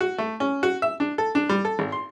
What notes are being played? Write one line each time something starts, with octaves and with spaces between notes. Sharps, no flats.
F#4
A3
C#4
F#4
E5
D4
A4
D4
G3
A4
G#1
C6